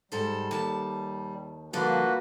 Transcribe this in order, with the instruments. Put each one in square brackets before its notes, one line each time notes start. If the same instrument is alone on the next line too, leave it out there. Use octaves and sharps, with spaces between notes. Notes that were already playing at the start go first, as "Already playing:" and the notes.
[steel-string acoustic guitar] G#2 A4 C5 [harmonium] G3
[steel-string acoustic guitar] D#2 A5
[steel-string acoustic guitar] D3 F3 G3 [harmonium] A#3 F#4 B4